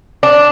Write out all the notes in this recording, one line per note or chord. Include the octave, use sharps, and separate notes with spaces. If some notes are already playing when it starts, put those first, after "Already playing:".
D4